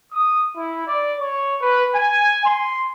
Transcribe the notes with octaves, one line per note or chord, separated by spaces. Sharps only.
D#6
E4
D5
C#5
B4
G#5
C6